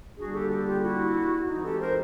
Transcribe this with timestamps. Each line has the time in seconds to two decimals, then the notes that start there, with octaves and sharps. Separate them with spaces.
0.17 D3 G3 A#3 D4 F#4 G#4
0.34 G4 A4
0.50 G4 A4
0.66 F4 G4
0.82 E4 F#4
1.48 E3 G#3 C4 D#4
1.64 G4 A4
1.80 A#4 C5